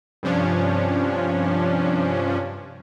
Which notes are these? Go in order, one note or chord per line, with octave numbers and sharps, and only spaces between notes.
G2 C3 F3 C#4 D4